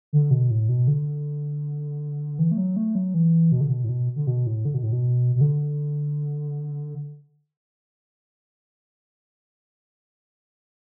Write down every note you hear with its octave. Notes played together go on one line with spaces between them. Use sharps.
D3
B2
A2
B2
D3
E3
A3
F#3
A3
F#3
E3
B2
D3
B2
A2
B2
D3
B2
A2
D3
B2
A2
B2
B2
D3